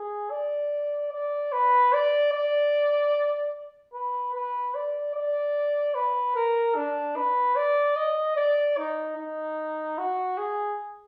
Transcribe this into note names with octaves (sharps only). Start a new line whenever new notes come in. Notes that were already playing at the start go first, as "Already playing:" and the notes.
Already playing: G#4
D5
D5
B4
D5
D5
B4
B4
D5
D5
B4
A#4
D4
B4
D5
D#5
D5
D#4
D#4
F#4
G#4